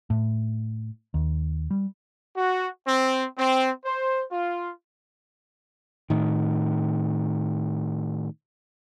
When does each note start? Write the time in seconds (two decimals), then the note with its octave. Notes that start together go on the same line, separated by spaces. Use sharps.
0.10 A2
1.14 D#2
1.71 G3
2.35 F#4
2.87 C4
3.37 C4
3.85 C5
4.31 F4
6.10 A2 D#3